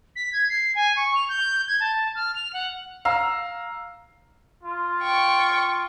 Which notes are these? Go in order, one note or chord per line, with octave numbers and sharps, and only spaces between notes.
B6
G#6
C7
G#5
C#6
F7
G6
G#6
A5
F6
F7
F#5
F5 A#5 E6
F4
G5 C#6